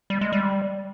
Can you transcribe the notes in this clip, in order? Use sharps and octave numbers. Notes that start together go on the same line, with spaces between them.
G3
G#3
G3